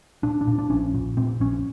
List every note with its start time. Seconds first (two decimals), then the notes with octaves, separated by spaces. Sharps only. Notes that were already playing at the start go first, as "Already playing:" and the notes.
0.23 A#2 D4
0.41 D4
0.47 A#2
0.58 D4
0.70 A#1 C#4
0.94 A#2
1.17 A#2 C4
1.40 A#1 C#4